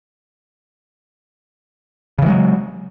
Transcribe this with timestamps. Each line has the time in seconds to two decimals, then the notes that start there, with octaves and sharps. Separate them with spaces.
2.19 C#3
2.22 E3
2.26 G#3
2.30 F#3